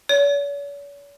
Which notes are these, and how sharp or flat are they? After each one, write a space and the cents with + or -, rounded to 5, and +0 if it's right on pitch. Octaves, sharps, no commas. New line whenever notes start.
C#5 +45